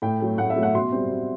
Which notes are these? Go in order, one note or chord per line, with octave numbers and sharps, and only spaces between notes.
A2 G5
F#3 A3
A2 F#5
E5
F#3 A3
F#5
B2 C6
G3 C4
B2